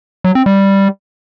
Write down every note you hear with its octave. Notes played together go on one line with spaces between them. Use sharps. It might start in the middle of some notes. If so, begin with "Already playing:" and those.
F#3
C4
G3